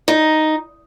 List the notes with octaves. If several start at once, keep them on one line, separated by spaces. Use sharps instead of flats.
D#4